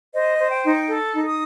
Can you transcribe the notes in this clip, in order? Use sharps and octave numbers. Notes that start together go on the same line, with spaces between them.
C5 D#5
C5
G5
D#4
A4
D#4
D#6